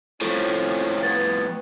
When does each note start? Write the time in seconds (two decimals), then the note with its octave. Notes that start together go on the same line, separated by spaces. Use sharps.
0.22 F2 A2 F3 C#4 A4
1.03 B3 G#6 A6